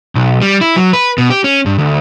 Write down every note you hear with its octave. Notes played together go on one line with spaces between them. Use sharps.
B1
G3
E4
F#3
B4
B2
G4
C#4
G2
D2